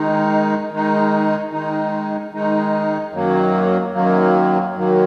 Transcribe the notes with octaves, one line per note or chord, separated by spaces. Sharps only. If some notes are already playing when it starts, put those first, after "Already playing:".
Already playing: D#3 G#3 D#4
D#3 G#3 D#4
D#3 G#3 D#4
D#3 G#3 D#4
F#2 D#3 F#3 A#3
F#2 D#3 F#3 A#3
F#2 D#3 F#3 A#3